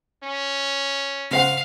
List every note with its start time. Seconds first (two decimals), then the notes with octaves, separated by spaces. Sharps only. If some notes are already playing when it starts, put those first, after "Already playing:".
0.23 C#4
1.31 C#3 C5 F5 F#5